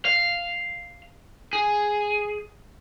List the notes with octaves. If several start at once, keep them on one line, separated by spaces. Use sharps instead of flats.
F5
G#4